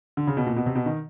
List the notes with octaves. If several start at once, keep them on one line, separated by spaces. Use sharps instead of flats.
D3
C#3
B2
A#2
B2
C3
B2
D#3